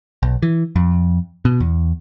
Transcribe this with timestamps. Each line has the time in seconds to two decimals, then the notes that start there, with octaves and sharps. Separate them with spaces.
0.23 B1
0.42 E3
0.76 F2
1.45 B2
1.60 E2